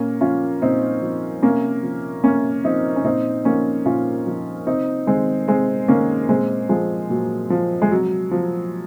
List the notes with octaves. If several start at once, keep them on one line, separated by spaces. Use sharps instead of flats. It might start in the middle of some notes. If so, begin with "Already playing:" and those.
Already playing: A#2 A#3 C#4
F3 C#4 F4
A#2 C4 D#4
F3
C3 A#3 C#4
F3
C3 A#3 C#4
F3 C4 D#4
C#4
A#2 C4 D#4
F3 A#3 C#4
A#2 C#4 F4
F3
C3 C4 D#4
D#3 G#3 C4
C3 G#3 C4
D#3 A#3 C#4
A#2 G#3 C4
F3 G#3
A#2 F#3
F3
G#3
C3 F#3
F3